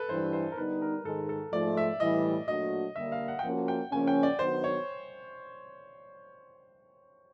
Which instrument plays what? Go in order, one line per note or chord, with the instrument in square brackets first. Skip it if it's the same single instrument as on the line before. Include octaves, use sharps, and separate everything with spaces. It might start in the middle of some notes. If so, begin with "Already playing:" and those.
Already playing: [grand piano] A4 B4
[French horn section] G2 E3 G3 [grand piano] C5
[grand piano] C5
A#4
[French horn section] D3 G3 B3 D#4 [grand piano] B4
[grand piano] A#4
[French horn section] G#2 D#3 G#3 [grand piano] A4
[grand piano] A4
[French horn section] G#2 F3 A3 [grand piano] D5
[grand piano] E5
[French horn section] A2 E3 G3 [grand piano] D#5
[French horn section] A#2 F#3 A3 D4 F#4 [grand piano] D#5
[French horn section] D3 G3 A#3 [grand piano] E5
[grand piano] F5
F#5
G5
[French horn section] F3 A#3 C#4 F#4 [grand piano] F#5
[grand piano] G5
[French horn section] C#3 F3 A#3 C#4 [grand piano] G#5
[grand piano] G5
D5
[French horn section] D#3 F#3 B3 D4 F#4 [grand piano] C5
[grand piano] C#5